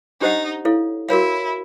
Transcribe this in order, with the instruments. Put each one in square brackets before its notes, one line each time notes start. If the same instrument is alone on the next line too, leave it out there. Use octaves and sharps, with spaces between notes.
[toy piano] D4 G4 C5 D#5 F#5 [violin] D#4
[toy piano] E4 A4 C#5 F5
[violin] E4 [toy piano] F#4 A#4 C#5 F5